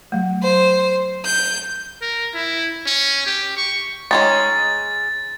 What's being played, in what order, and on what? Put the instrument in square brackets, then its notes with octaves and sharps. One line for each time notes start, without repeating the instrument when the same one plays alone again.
[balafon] F#3 A3
[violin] C5
G6
[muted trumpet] A#4
E4
C#4
G4
C#6
[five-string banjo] G#3 C#4 D#4 [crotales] A6